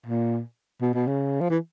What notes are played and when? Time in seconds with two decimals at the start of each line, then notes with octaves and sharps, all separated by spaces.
0.06 A#2
0.81 B2
0.94 B2
1.07 C#3
1.41 F3
1.50 E3